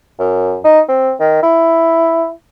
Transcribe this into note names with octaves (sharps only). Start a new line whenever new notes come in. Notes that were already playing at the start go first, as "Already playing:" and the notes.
F#2
D#4
C4
D#3
E4